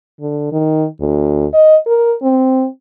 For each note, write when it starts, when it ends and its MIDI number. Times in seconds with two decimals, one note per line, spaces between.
0.21 0.47 50
0.52 0.86 51
1.00 1.46 38
1.54 1.76 75
1.87 2.15 70
2.22 2.66 60